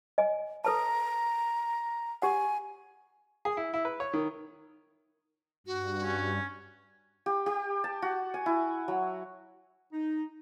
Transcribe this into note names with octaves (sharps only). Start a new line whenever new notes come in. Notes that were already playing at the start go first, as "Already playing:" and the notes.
D#5 G#5
A4 B4 A5 A#5
G4 F#5 G#5
G#4
E4
E4
B4
C#5
D#3
G2 F#4
C#4
G4
G4
A5
F#4
G#5
E4
F#3
D#4